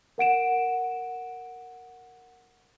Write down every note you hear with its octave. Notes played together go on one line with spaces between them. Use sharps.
A#4 F#5 D7 E7